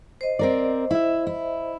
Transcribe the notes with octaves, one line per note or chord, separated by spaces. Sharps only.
C5 D#5
C4 A#4 D5
E4 E5
E4